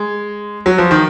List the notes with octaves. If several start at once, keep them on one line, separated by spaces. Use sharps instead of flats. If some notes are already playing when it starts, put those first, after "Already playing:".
Already playing: G#3
F#3
F3
D#3